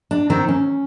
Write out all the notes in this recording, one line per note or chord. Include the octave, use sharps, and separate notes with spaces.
D4
D#3 C4
C#4